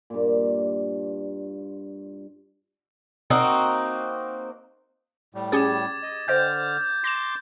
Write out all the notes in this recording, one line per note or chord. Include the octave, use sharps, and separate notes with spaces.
G2 A#2
A#3 C4 D#4 F#4
A2 G3
C#4 G4 G#4 D6 G#6 A6
D#5
D3 C5 D#5 G5 F6 G6
C6 D6 A#6 E7